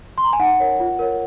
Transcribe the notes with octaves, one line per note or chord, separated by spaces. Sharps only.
C6
A#5
G#5
D#4 F#5
A#4 C#5
F4
A#4 C#5